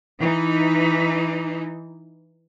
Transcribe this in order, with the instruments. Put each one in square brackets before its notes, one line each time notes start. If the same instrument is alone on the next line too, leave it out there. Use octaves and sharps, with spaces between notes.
[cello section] E3 D#4